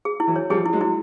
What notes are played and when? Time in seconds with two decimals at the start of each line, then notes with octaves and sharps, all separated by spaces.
0.05 G#4
0.20 E4
0.27 E3 F#3
0.36 C#5
0.50 F3 G3 G#4
0.66 E4
0.73 F#3 G#3
0.81 E4